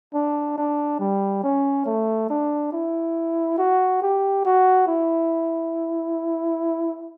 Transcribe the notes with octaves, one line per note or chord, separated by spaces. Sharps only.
D4
D4
G3
C#4
A3
D4
E4
F#4
G4
F#4
E4